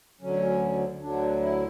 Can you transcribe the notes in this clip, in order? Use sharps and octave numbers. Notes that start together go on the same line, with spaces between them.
D2 D3 F#3 C#4
D2 D3 F#3 D4
E4